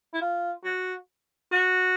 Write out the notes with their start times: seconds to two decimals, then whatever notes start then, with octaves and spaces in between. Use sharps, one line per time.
0.14 E4
0.21 F4
0.64 F#4
1.52 F#4